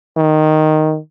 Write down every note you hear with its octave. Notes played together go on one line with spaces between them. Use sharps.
D#3